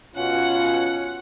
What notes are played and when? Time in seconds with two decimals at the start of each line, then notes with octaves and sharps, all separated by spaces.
0.16 B2 C#4 F4 F#5